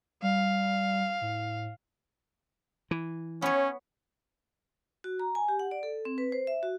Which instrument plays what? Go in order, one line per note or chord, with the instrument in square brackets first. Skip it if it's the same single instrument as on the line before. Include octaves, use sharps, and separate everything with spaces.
[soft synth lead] G3 [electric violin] F5
[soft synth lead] A2
[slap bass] E3
[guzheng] B3 C#5 [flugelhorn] C#4
[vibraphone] F#4
A#5
G#5
G4
F#5
D5
A4
C4
B4
C5
E5
F#4